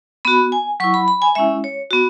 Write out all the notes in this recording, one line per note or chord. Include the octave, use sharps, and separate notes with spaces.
B3 F#4 B5
G#5
F#3 E4 C#6
B5
B5
G#5
G#3 C#4 E4 E5
C#5
B3 F#4